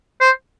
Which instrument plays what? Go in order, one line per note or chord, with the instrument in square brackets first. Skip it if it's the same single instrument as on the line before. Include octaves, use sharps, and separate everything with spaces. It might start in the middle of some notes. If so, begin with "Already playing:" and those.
[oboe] C5